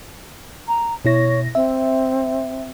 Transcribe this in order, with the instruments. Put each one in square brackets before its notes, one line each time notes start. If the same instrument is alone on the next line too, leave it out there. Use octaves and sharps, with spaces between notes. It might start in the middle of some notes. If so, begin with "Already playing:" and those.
[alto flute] A#5
[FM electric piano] B2 E4 A#6 [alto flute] C#5
[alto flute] C4 [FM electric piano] E5